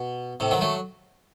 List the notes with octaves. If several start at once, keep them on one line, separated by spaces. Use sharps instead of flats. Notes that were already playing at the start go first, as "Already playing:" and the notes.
Already playing: B2
A2 C3
D#3 F#3
F#3 A3